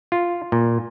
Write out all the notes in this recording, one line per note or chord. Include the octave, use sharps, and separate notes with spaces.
F4
A#2